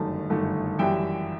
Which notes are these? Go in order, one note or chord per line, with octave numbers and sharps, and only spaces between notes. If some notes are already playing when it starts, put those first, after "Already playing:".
Already playing: G1 F#2 D#3 A3 A5
G1 F#2 D#3 A3
F#2 E3 G3 E5 G5